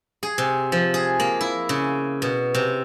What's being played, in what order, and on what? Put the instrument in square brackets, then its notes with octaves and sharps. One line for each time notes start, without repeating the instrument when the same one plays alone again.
[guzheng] G#4
C3
F3
G#4
A#3
E4
C#3
B2
C3